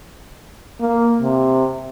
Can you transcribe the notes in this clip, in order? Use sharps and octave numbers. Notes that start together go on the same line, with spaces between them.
A#3
C3